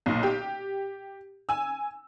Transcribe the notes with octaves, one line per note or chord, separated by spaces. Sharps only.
B1 A#2
G4
G#5 E6